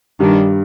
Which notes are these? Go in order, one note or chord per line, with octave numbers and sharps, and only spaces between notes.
G2 D#3 G3 D4